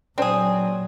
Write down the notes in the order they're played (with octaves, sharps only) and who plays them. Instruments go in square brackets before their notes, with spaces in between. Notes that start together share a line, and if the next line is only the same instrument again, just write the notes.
[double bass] A#2 F#3 [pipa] C4 G#4 [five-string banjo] D4 C5 A5